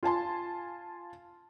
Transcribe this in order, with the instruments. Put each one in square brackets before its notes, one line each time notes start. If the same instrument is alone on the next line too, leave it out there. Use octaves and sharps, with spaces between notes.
[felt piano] F4 G#5 A5 C6